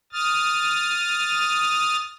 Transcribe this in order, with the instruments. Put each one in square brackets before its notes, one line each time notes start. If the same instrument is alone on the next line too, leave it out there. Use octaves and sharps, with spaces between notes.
[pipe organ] D#6 F6 A6